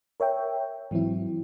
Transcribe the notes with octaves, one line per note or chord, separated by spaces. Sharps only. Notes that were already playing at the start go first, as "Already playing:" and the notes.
A#4 C#5 E5 G5
G#2 E3 F#3 C4 E4